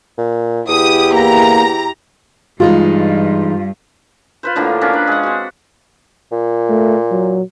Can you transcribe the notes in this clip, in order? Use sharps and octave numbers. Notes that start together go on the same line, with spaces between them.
A#2
E2 E4 G4 D#6
A#3 A#5
G2 E3 G#3 D#4 F4
F4 B4 C5
A2 D3 F3 A#3
C#4 D4 A#4
B4
G#3 F#5
C4 F#4
A#2
A3
F#3